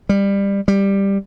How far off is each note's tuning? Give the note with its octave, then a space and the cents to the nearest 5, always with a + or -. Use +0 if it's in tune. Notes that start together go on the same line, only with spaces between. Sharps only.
G3 +20
G3 +10